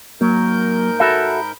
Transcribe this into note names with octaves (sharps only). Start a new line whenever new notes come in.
G#2 F#3 A#3 A#4 G6
F#4 A4 E5 B5